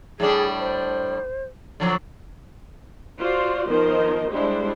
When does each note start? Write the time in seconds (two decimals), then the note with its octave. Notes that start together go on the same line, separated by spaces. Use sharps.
0.20 A2 G3 D4 G#4
0.60 C5
1.80 D3 F3 F#3
3.19 F4 F#4 C5 D5
3.68 D#3 F3 B3 A#4 C5 D#5
4.31 G3 G#3 D4 E4 C5